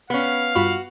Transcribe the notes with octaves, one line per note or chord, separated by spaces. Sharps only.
B3 C#4 F5
G2 F4 F#4 B5